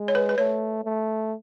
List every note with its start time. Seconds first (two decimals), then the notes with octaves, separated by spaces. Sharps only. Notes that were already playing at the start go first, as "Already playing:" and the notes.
Already playing: G#3
0.08 C#5
0.15 B4
0.29 B4
0.38 A3 C#5
0.85 A3